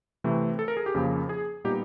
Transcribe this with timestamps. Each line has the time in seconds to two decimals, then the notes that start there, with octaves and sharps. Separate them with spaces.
0.24 C3 E3 A3 C4
0.59 A4
0.68 A#4
0.77 G#4
0.86 G4
0.95 F2 C#3 F3 A#3
1.29 G#4
1.64 A#2 G3 B3 D#4 G4